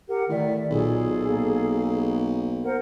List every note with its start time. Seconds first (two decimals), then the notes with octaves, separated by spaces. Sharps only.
0.08 G4 A#4 F#5
0.29 A2 D#3 D5 E5
0.71 B1 A#2 G#4 A4
1.26 A#3
2.64 A#4 C5 F#5